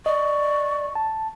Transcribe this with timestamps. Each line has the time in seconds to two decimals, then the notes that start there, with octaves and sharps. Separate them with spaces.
0.06 D5 D#5 C#6
0.95 A5